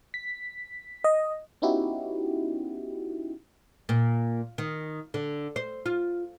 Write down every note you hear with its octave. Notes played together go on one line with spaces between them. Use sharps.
B6
D#5
B3 C#4 D#4 E4 F#4 G4
A#2
D#3
D3
C5
F4